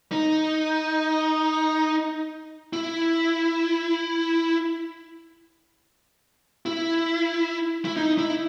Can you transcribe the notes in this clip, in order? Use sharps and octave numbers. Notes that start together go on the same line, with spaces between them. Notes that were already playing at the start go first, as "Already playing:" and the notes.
D#4
E4
E4
E4
D#4
E4